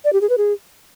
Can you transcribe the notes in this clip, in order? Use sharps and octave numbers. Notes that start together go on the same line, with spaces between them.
D5
G4
G#4
B4
G#4